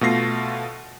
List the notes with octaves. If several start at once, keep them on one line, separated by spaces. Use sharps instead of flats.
B2 A3 F4 A#6 C7